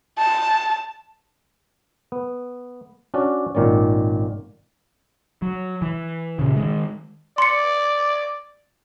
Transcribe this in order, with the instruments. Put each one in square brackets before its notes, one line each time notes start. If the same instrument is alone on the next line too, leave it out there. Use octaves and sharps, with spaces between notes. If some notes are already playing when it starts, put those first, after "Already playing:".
[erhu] A5
[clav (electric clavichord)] B3
C#4 D4 F#4 D5
G#1 A#2 D#3 C#4 D5
[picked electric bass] F#3
E3
A#2 C#3
D#3 G#3
[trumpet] D5 [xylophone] C6 C#7